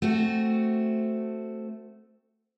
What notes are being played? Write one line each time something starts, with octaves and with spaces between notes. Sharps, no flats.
A3 C4 F#4